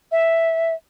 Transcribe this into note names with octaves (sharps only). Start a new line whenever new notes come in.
E5